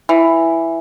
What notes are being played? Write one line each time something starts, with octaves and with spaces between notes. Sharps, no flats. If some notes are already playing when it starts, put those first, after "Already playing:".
E3